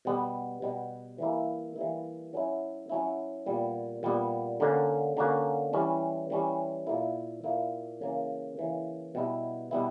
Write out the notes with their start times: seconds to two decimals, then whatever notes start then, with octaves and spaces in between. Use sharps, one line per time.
0.05 B2 G3 B3
0.62 B2 G3 B3
1.18 E3 G3 A#3 E4
1.76 E3 G3 A#3 E4
2.33 F#3 C#4 E4
2.89 F#3 C#4 E4
3.46 A#2 G3 B3
4.03 A#2 G3 B3
4.60 D3 A#3 C#4 F#4
5.17 D3 A#3 C#4 F#4
5.73 E3 G3 C#4
6.30 E3 G3 C#4
6.87 A#2 A#3 E4
7.44 A#2 A#3 E4
8.01 C#3 E3 A#3
8.57 C#3 E3 A#3
9.15 B2 G3 B3 E4
9.71 B2 G3 B3 E4